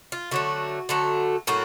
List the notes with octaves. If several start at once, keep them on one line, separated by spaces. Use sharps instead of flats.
F4
D3 F#3 A3 F#4
D3 F#3 A3
A2 F#3 A#3 F#4